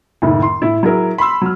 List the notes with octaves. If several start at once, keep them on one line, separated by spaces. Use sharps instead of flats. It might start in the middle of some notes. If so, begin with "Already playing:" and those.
F#1 A2 D#3
C6
A2 E4
F#3 E4 G#4 A#4
B5 C6 E6
F#3 F6